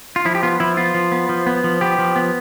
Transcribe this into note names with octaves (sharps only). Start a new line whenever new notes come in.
F4
F3 E4
G4
B3 F4
F3 E4
B3 F4
F3
B3
F3
B3
F3
B3 G4
F3
B3